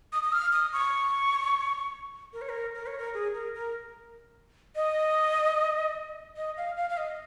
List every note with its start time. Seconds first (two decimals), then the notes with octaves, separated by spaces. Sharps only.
0.13 D#6
0.23 D#6
0.33 F6
0.53 D#6
0.73 C#6
2.33 A#4
2.42 C#5
2.49 A#4
2.74 A#4
2.87 C#5
2.99 A#4
3.14 G#4
3.34 A#4
3.55 A#4
4.75 D#5
6.37 D#5
6.57 F5
6.77 F5
6.89 F5
6.97 D#5